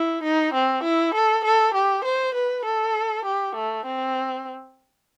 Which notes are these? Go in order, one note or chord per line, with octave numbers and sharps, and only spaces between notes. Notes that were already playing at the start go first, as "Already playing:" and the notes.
Already playing: E4
D#4
C4
E4
A4
A4
G4
C5
B4
A4
G4
A3
C4